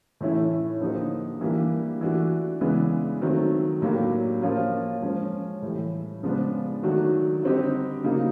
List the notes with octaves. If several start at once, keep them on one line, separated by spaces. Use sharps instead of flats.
A2 E3 A3 C#4 E4
D3 F3 A#3 D#4 G4
E3 G3 A#3 D4 G4
E3 A3 D4 F#4
C#3 E3 G#3 B3 D4
D#3 F#3 A3 C4
A2 F#3 A#3 D4 G4
F3 A#3 C#4 F4
F3 G#3 C#4
A2 E3 G3
C#3 F3 G#3 B3 D4
D#3 F#3 A3 D4 F#4
D3 G3 C4 D#4 G4
C#3 F#3 A#3 D#4